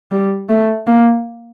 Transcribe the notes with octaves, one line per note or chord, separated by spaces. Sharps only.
G3
A3
A#3